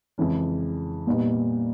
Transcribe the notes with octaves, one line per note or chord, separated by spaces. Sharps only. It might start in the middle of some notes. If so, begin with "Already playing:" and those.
F2 C#3 E3 G#3 C#4
A#2 G3 B3 D#4